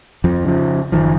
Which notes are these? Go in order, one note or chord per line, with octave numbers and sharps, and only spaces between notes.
F2 F3
C#3 F3
F#1 D#3 F3